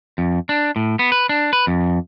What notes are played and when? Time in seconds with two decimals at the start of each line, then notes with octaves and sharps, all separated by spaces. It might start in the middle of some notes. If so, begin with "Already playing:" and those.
0.18 F2
0.49 D4
0.76 A2
0.99 B3
1.12 B4
1.29 D4
1.53 B4
1.67 F2